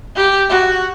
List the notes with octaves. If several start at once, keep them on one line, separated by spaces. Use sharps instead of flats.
G4
F#4